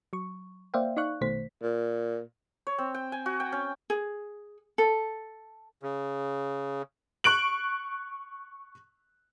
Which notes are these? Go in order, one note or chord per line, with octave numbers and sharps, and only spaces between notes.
F#3 C#6
A#3 C5 D5 E5 F5 G5
D#4 D5 F5 C#6 F#6
A#1 B2 D#3 A3 C5 B6
A#2
C#5
C4
G5
G#5
F#4
G5
C#4
G#4
A4
C#3
C#6 F#6 D7 F#7